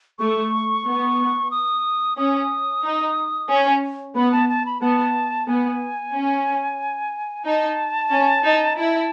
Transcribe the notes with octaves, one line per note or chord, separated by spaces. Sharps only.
A3 C#6
B3
D#6
C#4 D#6
D#4
C#4
B3 B5
A5
A5
B5
B3 A5
B3 G#5
C#4
D#4 A5
C#4
D#4
E4 A5